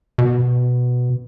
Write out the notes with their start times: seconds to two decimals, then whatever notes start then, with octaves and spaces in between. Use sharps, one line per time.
0.18 B2